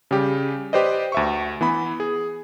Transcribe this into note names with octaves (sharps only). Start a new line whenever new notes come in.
C#3 G3 G4
G4 B4 C5 D5 D#5
D2 E5 C#6
E3 B3 B5
G#4